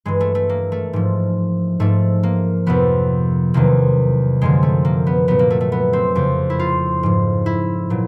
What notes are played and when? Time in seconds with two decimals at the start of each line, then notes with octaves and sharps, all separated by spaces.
0.05 G2 E3 G#3
0.20 A3
0.35 A3
0.49 A#3
0.72 A3
0.93 G#2 F3
1.80 G#2 F3 A3
2.23 A#3
2.66 F2 C3 F3 B3
3.54 E2 C3 D#3 F#3 A#3
4.41 F#2 D3 F3 G#3
4.63 A3
4.85 A#3
5.07 B3
5.28 A#2 F#3 B3
5.39 A#3
5.50 A3
5.61 A3
5.72 B3
5.93 C4
6.15 F2 C#3 F3
6.50 E4
6.59 F4
7.03 G#2 F3
7.46 E4
7.90 A#2 F#3